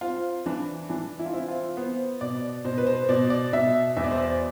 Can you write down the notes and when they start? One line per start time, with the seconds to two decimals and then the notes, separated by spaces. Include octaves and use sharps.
0.01 C4 F4
0.46 E3 D4
0.89 E3 D4
1.19 E4
1.26 F4
1.33 C4 E4
1.48 F4
1.77 B3 C5
2.21 B2 D5
2.65 B2 C5
2.78 B4
2.87 C5
3.09 B2 D5
3.30 D5
3.53 B2 E5
3.97 E2 E5
4.04 D5
4.11 C5
4.18 D5